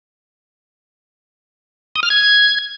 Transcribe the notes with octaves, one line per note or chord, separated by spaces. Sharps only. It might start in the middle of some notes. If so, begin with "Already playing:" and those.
D#6
F6
G#6